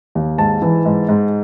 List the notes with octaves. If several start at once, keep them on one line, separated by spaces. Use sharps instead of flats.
D#2
G#2 A5
E3
G#2
G#2